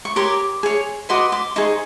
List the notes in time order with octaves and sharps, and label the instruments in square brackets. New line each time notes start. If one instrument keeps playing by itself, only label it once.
[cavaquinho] C#6
G4 A#4 C#5 C6 D6
G#4 C#5
F#4 B4 D#5 C6 D6
C6 D6
D#4 G#4 C5 C#6